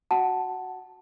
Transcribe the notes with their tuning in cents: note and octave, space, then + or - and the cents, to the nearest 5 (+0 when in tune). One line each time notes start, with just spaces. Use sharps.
F#4 +0 F#5 +10 A5 +0